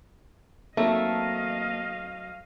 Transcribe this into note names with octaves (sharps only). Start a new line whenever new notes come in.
F#3 A3 A#3 C4 D#4 D#5 F5